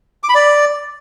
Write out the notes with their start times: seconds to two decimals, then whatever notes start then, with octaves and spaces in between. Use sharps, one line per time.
0.23 D6
0.29 B5
0.35 D5